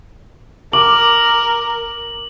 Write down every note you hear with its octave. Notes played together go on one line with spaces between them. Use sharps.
A#4 D6 F#7